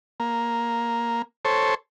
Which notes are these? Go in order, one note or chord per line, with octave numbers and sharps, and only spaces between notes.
A#3
A4 C5 C#5